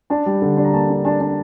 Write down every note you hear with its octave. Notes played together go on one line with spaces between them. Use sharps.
D4 A5
G3
D3
D4
A#5
A#3 A5
D4
D4 A5
D4